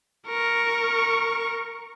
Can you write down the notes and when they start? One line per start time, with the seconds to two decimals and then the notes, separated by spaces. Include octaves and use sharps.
0.27 A#4 C#6